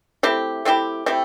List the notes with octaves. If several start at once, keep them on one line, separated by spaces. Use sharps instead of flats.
A3 C4 E4 G4
A3 C4 E4 G4
A3 C4 E4 G4